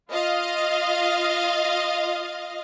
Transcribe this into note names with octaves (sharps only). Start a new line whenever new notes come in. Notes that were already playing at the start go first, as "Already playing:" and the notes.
F4 D#5 F5